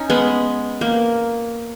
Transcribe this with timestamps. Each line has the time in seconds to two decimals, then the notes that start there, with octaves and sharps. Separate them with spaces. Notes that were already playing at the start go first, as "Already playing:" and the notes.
Already playing: C#4 D#4
0.10 G#3 B3
0.81 A#3